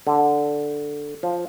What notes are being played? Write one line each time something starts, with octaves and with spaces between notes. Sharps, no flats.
D3
F3